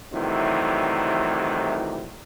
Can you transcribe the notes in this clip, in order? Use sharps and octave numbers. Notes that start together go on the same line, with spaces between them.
A2 C3 D#3 E3 F#3 G3